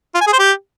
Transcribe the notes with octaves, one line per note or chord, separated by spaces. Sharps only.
F4
G#5
G#4
C5
G4